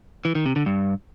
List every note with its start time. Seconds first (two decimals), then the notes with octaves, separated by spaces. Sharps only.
0.25 E3
0.35 D#3
0.46 C3
0.56 D3
0.66 G2